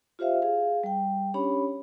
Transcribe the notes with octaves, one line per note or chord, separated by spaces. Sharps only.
F4 G4 C5 E5 F5
G#4 F5
G3 G5
C#4 D4 G4 C#5 B5